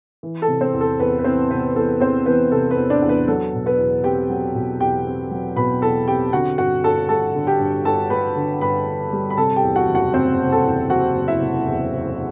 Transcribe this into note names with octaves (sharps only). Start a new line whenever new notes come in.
E3
A4 A5
C3
C4 C5
E2
A4
E2 B3 B4
B4
E3 C4 C5
C3 B3 B4
E2 A4
E2 C4 C5
E3 B3 B4
C3 A4
B3 B4
E2
D4 D5
E2
B3 B4
F#3 A4
B2
B3 B4
E2
C4 G4 G5
F#3
B2
E2 G4 G5
C4
F#3
B2 B4 B5
E2 A4 A5
C4 G4 G5
D3 F#4 F#5
G2 F#4 F#5
G1 A4 A5
G3 A4 A5
D3
G4 G5
G2
G1 A4 A5
G3 B4 B5
D3
G2 B4 B5
G1
G3
B5
C3 A4 A5
G4 G5
E2
F#4 F#5
F#1
F#4 F#5
F#1 C4 C5
C3
A4 A5
E2
F#1 F#4 F#5
F#1
E4 E5
C3
E2
F#1